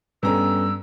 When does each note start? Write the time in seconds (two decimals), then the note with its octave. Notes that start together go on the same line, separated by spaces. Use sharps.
0.23 G2 B3 C#4 A4 A#5 E6